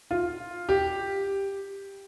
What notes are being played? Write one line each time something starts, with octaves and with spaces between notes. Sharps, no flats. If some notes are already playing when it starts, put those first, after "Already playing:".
F4
G4